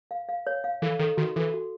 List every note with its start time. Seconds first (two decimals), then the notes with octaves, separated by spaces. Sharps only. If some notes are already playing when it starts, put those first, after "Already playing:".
0.11 F5
0.29 F5
0.47 C#5
0.64 F5
0.82 E3 A4
0.99 D#3 A4
1.17 D#3 F#4
1.36 E3 A4
1.54 F#4